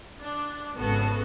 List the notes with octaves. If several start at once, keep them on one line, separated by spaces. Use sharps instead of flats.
D4
G#1 C#3 B3 F#4 A4